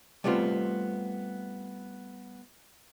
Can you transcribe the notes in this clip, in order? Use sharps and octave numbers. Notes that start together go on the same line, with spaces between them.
G3 A3 B3 C4 F4